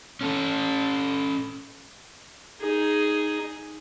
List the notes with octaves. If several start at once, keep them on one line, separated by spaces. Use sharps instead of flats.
C#4 A4
D#4 G#4